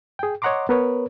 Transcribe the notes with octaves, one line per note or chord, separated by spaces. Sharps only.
G#4 G5
C#5 D#5 F#5 A#5 C6 D6
B3 A#4 B4 C#5